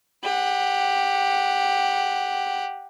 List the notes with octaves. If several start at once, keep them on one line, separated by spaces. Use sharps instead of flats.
G4 F#5